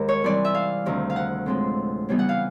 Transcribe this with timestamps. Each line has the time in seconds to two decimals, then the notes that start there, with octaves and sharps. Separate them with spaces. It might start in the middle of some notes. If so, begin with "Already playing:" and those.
Already playing: D#2 D#3 G#3 A#4
0.09 C#5
0.22 C3 E3 G3 C4 D5
0.45 E5
0.54 F5
0.85 D2 C3 D#3
1.10 F5
1.16 F#5
1.46 A2 F3 G#3 C4
2.09 C#3 E3 G3 B3 D#4
2.19 F#5
2.29 F5